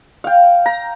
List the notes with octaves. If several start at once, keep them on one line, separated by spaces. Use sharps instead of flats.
F5 G5
A#5